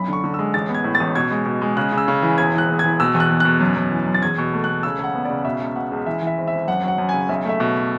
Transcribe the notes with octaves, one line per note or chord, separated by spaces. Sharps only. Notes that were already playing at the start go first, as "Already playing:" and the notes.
Already playing: B1 F#2 B5
D3 C#6
D3
G#3 E6
A1 A6
B3
G#6
A2
A6
A1
B2 G#6
G#3
B2
G#3
C#3 F#6
C#3
E6
C#3
E3
E1 G#6
E3 F#6
E1
E3 G#6
B2 E6
E2
F#6
E2
B2 F#6
F#2
F#2
E3
F#2
A6
E2 G#6
B2
A3
A3 F#6
C#3 E6
C#2 F#5
B3
D5
C#3
B2 E5
C#2
B2 F#5
C#2
E3 E5
E3
E5
G#1
E5
G#1
F#2 F#5
F#3 F#5
F#2
G#5
C#3
B1 E5
A3 E5
B2